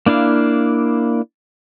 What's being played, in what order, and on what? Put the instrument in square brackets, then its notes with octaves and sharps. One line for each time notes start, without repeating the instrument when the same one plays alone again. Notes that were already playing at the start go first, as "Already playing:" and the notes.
[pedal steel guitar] A#3 D4 E4 F5